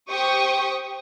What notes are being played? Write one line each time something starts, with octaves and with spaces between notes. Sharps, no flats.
G4 C5 G5 C#6 D#6